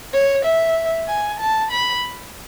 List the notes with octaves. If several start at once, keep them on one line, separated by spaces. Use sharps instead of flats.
C#5
E5
G#5
A5
B5